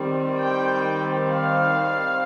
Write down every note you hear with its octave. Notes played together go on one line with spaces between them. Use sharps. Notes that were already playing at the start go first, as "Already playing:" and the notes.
Already playing: D#3 G3 C4
G5
F5